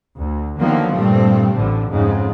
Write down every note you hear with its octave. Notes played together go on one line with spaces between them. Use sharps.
D2
D3 D#3 F3 F#3 A#3 B3
G2 A#2 G3 A3 C4
A1 A2 D3
F2 G#2 C#3